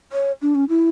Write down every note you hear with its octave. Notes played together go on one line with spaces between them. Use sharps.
C#5
D4
C#4
E4